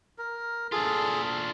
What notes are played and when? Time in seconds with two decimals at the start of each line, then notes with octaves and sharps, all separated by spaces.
0.18 A#4
0.72 D4 F4 G#4 A4